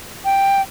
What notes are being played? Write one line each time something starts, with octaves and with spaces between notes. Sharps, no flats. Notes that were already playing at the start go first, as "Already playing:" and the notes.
G5